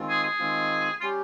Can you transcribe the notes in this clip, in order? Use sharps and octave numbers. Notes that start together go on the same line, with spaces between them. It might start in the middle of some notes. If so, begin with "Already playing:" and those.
Already playing: D#3 G#3 C4 F4
G#4
G#4
D#3 G#3 C4 F4
G3 C#4 F4 G4